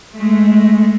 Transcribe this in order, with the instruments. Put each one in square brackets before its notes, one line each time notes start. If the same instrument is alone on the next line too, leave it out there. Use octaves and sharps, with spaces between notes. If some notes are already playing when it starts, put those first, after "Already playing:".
[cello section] G#3 A3